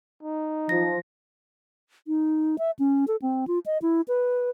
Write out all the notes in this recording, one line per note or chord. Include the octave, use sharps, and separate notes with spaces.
D#4
F3 A#6
D#4
E5
C#4
A4
C4
F4
D#5
E4
B4